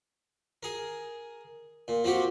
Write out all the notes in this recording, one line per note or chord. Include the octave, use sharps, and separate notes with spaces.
G#4 A#4
A#2
F3 C4 F#4 G4